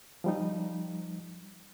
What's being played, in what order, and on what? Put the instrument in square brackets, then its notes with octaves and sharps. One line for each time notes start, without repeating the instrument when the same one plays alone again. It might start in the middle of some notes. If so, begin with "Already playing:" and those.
[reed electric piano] F3 G3 D#4